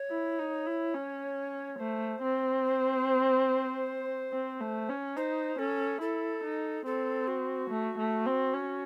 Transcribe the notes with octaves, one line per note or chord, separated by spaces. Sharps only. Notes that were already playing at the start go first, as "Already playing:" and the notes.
Already playing: C#5
E4
D#4
E4
C#4
A3 C5
C4
C5
C4
A3
C#4
D#4 C5
C#4 A4
E4 A4
D#4
C4 A4
F#4
A3
A3
C4
C#4